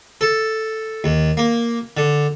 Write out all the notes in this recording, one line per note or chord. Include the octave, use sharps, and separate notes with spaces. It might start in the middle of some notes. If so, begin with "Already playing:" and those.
A4
D#2
A#3
D3